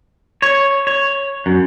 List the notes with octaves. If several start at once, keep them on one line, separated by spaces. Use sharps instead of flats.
C#5
C#5
F#2